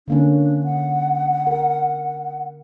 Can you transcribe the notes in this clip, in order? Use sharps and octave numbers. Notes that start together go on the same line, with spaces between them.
D3 A#3 C#4 D4
F#5
A#4